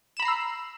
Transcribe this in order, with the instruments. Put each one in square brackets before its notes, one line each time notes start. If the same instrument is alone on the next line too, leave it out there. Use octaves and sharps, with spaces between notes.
[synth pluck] E7
B5
A#5
C7
E6